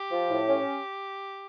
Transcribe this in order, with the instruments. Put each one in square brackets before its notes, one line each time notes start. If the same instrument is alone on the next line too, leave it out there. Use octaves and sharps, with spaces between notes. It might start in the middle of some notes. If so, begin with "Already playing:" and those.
Already playing: [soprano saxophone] G4
[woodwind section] F3
A2
C#4